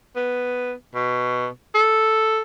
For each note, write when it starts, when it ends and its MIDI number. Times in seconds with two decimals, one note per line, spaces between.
0.16 0.73 59
0.95 1.47 47
1.75 2.41 69